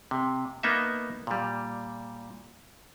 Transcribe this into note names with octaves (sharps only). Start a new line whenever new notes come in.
C3
A#3 B3 D#4 E5
A#2 G3